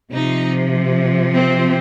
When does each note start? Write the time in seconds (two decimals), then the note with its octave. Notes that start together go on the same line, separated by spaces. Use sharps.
0.11 C3 F3 D#4
1.36 C4